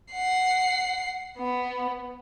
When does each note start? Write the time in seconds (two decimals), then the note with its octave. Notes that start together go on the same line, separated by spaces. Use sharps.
0.12 F#5 C7
1.38 B3